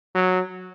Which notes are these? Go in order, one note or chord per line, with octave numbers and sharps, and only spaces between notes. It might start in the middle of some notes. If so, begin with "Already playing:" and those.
F#3